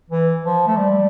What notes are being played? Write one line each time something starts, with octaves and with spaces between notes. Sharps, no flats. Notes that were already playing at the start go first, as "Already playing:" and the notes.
E3
F3
A3
G3